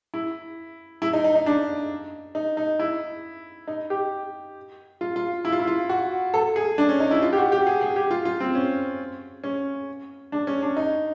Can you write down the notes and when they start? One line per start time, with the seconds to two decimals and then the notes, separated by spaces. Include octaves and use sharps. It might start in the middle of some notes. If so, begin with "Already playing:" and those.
0.14 E4
1.02 E4
1.13 D#4
1.24 D#4
1.35 D#4
1.46 D4
2.35 D#4
2.57 D#4
2.79 E4
3.68 D#4
3.90 G4
5.01 F4
5.16 F4
5.45 E4
5.52 F4
5.59 E4
5.67 F4
5.89 F#4
6.34 A4
6.56 G#4
6.78 D4
6.89 C#4
7.00 D#4
7.11 E4
7.22 F4
7.33 G4
7.37 F#4
7.52 G4
7.67 G#4
7.81 G#4
7.96 G4
8.11 F4
8.25 F4
8.40 C4
8.55 C#4
9.44 C#4
10.32 D4
10.47 C#4
10.62 D4
10.77 D#4